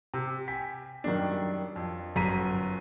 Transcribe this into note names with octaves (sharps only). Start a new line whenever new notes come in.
C3
G5 G#5 B6
F#2 D#3 G3 D4
F2
G1 F#2 A#5 B6 D#7